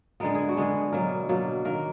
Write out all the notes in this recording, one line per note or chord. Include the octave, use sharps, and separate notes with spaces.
D3 G#3 B3 A#4
G#4
F#4
D3 G#3 B3 G#4
B2 F#3 A#3 A#4
B2 F#3 A#3
D#3 A#3 A#4